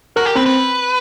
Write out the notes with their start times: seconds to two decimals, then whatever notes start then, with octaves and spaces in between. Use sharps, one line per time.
0.16 F#4 A#4
0.25 G4
0.35 C4 B4
0.46 B4